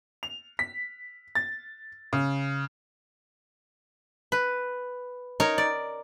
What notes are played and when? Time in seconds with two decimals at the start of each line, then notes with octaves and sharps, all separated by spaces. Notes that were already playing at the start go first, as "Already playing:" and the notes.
0.23 F7
0.59 B6
1.35 A6
2.13 C#3
4.32 B4
5.40 D#4 A#4 C#5
5.58 D5